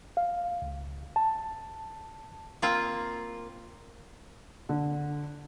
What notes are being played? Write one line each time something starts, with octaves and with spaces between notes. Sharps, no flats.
F5
C#2
A5
A#3 C4 F4
D3